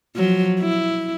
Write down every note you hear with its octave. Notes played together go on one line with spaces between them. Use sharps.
F3 F#3
E4